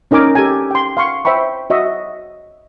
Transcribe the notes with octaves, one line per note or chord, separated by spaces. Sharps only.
C#4 D#4 A#4 G#5 D6
G4 A4 G#5
G5 C6
F5 C6 C#6
C5 E5 G5 B5 C#6
F#4 D#5 E5 C#6